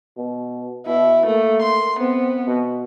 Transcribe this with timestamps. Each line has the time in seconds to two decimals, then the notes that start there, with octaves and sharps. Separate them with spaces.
0.17 B2
0.87 B2 E4
1.27 A3 A#3
1.63 C6
2.00 B3 C4
2.47 B2